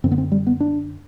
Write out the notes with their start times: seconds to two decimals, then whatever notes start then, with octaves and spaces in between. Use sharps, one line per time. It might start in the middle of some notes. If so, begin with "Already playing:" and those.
0.04 F#2 D3 C4
0.12 B3
0.18 C4
0.32 G3
0.47 B3
0.60 D4